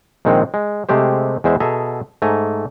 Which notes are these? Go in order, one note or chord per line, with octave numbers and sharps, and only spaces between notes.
A#1 D#3 G#3 C4 F#5
G#3
C3 G#3 A3 G4 C5
E2 G#3 C5 E5
B2 G#4 A4 E5 A#5
G#2 A3 G#5 A#5